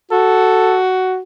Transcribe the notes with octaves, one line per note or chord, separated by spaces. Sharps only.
F#4 A4